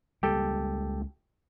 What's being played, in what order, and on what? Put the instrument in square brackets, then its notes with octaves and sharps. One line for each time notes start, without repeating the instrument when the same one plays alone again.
[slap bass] C#2 G3 A#3 [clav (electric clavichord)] G4 A4